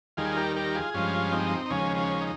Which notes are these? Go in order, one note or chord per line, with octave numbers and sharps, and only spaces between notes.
D#2 D#3 G3 F4 G#4
G4 A#4
G4 A#4
F4 G#4
G2 F3 G#3 C#4 F4
C4 D#4
D#4
D#2 C#3 F3 G#3 C#4
C#4
D#4